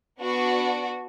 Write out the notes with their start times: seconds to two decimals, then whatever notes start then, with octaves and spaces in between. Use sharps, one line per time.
0.19 B3 D4 F#4